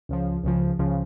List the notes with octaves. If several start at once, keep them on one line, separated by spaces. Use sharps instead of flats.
C#2 C#3 F3
C#2 C#3 F3
C#2 C#3 F3